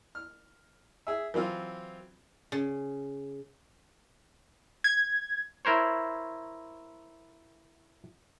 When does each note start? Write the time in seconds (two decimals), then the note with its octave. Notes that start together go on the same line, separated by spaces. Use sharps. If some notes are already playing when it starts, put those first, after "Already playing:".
0.15 F6
1.07 G#4 E5
1.34 E3 F#3 C4 F4
2.52 C#3
4.84 G#6
5.65 E4 A#4 C5 C#5